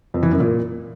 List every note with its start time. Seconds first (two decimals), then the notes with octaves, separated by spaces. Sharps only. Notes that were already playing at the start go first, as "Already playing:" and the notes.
0.14 F2
0.23 E3
0.31 F#2
0.40 A#2